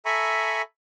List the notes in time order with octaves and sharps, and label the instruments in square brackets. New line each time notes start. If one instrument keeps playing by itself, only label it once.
[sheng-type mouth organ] A4 E5 G#5 A#5 B5 C#6